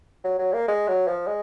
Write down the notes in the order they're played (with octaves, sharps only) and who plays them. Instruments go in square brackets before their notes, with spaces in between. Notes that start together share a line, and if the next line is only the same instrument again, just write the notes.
[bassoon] F#3
F#3
A#3
G#3
F#3
F3
G#3